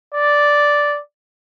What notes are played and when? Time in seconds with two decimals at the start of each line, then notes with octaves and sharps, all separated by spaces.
0.14 D5